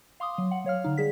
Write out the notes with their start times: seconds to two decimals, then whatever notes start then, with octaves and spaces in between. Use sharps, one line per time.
0.20 F5 C6 D6 D#6
0.38 F#3
0.51 F#5
0.64 F#3 C#5 F5 F6
0.84 D3 D#4
0.98 G3 G#4 B6